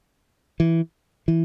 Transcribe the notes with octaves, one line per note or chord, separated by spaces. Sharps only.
E3
E3